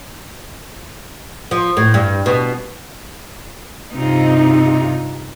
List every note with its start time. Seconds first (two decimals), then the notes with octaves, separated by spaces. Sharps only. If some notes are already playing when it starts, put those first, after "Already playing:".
1.51 F3
1.77 A2
1.94 G2
2.26 B2
3.94 G2 C3 D#4 F4